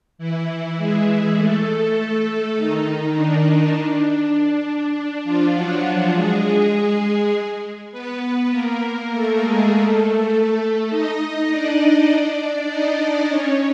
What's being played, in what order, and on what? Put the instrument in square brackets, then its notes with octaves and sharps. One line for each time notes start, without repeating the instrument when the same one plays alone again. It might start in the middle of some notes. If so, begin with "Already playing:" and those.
[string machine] E3 E4
G#3 G#4
A3 A4
A3 A4
D#3 D#4
D4
D4
D4
F3 F4
F#3 F#4
G#3 G#4
B3 B4
A#3 A#4
A3 A4
G#3 G#4
A3 A4
D#4 D#5
D4 D5
D#4 D#5
C#4 C#5